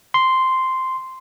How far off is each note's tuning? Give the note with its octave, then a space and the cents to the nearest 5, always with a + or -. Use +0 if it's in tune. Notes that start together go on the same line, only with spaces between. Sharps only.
C6 -5